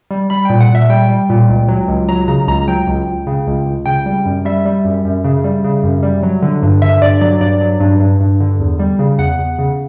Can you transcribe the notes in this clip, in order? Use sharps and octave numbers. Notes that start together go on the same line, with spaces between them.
G3
G3 B5
A#2 G5
F#5
A#2
E5
G3 G5
G3
A#2
C#2
F#3
C#2
F#3 A#5
C#3 A#5
C#2 A#5
F#3 G5
C#2
C#2
C#3
C#2
C#2
C#3 G5
G3
F#2
G3 E5
G3
F#2
F#2
C#3
G3
C#3
F#2
G3
F#3
D3
G2
D3 E5
G2 D5
F#3 D5
G2 D5
F#3
G2
G2
G2
D3
E2
G3
C#3
E2 F#5
E2
C#3